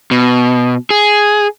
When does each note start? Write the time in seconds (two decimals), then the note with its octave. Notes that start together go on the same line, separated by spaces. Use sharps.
0.11 B2
0.90 G#4